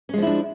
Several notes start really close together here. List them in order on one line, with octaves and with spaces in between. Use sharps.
C#4 G#3 F3 E4 D4